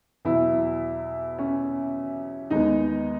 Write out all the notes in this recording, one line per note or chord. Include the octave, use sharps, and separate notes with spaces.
E2 B2 F#3 E4
C#4
D#2 D#3 G#3 B3 D#4